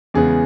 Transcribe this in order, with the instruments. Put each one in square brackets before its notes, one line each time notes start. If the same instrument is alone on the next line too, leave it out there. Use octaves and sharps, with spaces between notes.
[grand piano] E2 C#3 G#3 B3 G#4